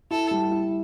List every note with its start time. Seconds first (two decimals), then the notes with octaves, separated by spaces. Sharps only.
0.11 E4 A4
0.31 G3
0.52 E4